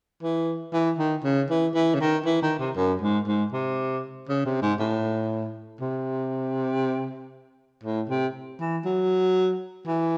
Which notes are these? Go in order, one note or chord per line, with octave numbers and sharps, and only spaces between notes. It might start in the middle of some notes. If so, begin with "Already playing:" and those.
E3
E3
D#3
C#3
E3
E3
C#3
D#3
E3
D#3
C3
F#2
G#2
G#2
C3
C#3
C3
G#2
A2
C3
A2
C3
E3
F#3
E3